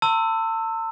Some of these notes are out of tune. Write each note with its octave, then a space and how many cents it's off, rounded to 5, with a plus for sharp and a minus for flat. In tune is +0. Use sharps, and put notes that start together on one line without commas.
A5 +40 C6 +0 E6 +0